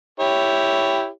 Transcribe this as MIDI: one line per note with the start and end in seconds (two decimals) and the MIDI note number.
0.20 1.08 64
0.20 1.08 67
0.20 1.08 73